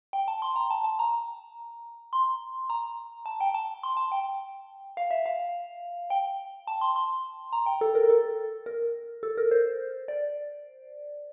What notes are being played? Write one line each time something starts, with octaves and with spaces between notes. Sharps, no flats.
G5
A5
C6
A#5
A5
A5
A#5
C6
A#5
A5
G5
A5
C6
A5
G5
F5
E5
F5
G5
A5
C6
C6
A#5
G5
A4
A#4
A4
A#4
A4
A#4
C5
D5